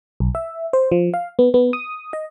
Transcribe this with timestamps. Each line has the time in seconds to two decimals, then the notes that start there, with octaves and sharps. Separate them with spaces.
0.20 B1
0.35 E5
0.73 C5
0.92 F3
1.14 F5
1.39 B3
1.54 B3
1.73 D#6
2.13 D#5